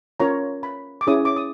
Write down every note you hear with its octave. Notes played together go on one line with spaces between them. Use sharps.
C#4 F4 A#4 C#5 A#5
B5
D6
C#4 E4 G#4 C#5 D#6
D6
D#6